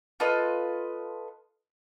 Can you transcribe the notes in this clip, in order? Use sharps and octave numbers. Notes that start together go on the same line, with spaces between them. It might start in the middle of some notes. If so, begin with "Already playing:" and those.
F4 A4 B4 D#5